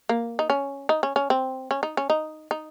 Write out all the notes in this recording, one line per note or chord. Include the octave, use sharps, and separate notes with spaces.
A#3
D#4
C#4
D#4
C#4
C#4
C4
C#4
D#4
C#4
D#4
D#4